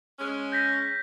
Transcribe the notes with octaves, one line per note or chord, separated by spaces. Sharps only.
G#3 C#4
G6 A#6 B6